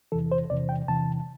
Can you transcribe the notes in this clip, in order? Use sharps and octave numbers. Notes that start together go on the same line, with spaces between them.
E2 C3 E3 A4
C5
E2 C3 E3 D5
G5
E2 C3 E3 A5